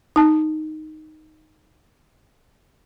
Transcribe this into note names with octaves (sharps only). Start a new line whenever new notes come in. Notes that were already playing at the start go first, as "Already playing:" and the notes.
D#4 A5